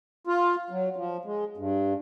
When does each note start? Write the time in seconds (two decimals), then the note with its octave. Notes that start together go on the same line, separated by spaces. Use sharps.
0.27 F4
0.70 F#3
0.96 F3
1.25 G#3
1.57 G2